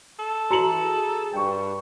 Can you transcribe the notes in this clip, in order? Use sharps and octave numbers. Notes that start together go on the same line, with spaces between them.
A4
E3 F#4 A#5 C#7 F#7
G#4
G2 G5 C#6